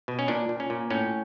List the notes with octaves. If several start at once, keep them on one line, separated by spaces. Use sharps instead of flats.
B2
C#4
A#2 D4
A#2
C#4
A#2
A2 C#4